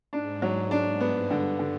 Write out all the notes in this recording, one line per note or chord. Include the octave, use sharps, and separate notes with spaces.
G#2 D4
F#3
G#2 D4
G2 B3
G2 D3
D3